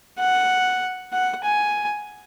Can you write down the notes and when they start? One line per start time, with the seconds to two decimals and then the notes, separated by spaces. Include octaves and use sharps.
0.19 F#5
1.12 F#5
1.44 G#5